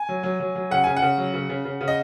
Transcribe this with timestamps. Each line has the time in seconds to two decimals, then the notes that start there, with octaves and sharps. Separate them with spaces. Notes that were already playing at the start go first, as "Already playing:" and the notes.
Already playing: G#5
0.09 F#3
0.23 F#3
0.40 F#3
0.55 F#3
0.71 C#3 F#5
0.84 C#3 G#5
0.97 F#5
1.02 C#3
1.18 F#3
1.34 C#3
1.49 C#3
1.65 C#3
1.81 C#3
1.88 D#5